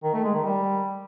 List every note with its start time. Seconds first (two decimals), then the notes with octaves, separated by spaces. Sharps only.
0.03 D#3
0.14 A3
0.24 G#3
0.34 D#3
0.44 G3